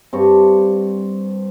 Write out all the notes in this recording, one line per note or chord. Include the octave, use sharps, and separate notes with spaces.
G2 C4 C#6